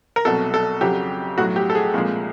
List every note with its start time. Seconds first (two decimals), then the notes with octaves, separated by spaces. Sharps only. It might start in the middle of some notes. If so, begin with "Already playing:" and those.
0.16 A#4
0.25 C2 B2 F#3 A4
0.54 A4
0.81 F2 C#3 F#3 G4
1.37 B1 A2 F#3 F#4
1.56 G4
1.70 A4
1.75 G#4
1.94 C2 A#2 F3 G#3